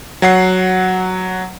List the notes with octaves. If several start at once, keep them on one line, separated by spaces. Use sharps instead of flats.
F#3 F#5 C7